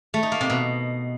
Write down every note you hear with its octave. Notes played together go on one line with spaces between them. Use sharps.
A3
D#4
A#3
C3
B2